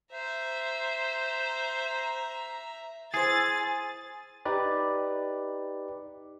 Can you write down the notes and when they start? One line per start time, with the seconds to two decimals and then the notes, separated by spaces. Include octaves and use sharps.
0.12 C5 E5 A#5
3.14 E4 G#4 C5 G#5 A6
4.45 D#4 G4 B4 D5